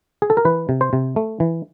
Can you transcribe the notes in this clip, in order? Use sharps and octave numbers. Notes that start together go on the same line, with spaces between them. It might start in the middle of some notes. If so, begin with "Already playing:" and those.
G#4
A4
A#4
E3 B4
C3
C5
C3
A3
E3